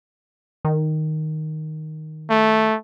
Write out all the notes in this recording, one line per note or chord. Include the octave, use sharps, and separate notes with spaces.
D#3
A3